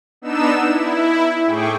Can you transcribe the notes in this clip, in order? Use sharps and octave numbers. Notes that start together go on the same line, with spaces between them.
B3 D4 D#4 E6 E7
E4
A2 G#4 G5 C#6 D6